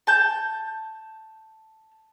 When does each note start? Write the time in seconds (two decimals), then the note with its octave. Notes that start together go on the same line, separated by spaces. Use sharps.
0.07 A5 G6